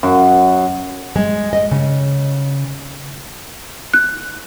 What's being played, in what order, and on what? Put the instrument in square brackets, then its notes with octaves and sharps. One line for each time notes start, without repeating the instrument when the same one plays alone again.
[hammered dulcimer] F#2
[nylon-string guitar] G#3
D#5
C#3
[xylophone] F#6